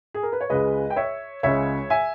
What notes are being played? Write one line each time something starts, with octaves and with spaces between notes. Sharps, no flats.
G#4
A#4
B4
C#5
C#2 C#3 G#3 B4 D#5
G5
C#5 E5
C#2 C#3 G#3 C#5 E5
E5 G#5